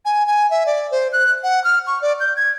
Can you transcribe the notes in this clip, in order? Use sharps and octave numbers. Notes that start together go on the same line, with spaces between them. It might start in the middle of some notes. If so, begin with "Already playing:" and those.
G#5
G#5
E5
D5
C5
F#6
F#5
F6
C#6
D5
G6
G#6